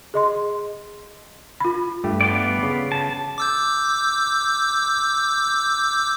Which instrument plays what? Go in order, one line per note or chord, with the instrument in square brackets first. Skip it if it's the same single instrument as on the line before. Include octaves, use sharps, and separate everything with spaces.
[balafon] G#4 D#5 C6
F4 B5
[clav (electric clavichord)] G2 A3 G4
[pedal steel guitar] B3 F4 D5
[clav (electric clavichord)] C#3
[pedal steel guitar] A5
[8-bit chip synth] D6 E6 G6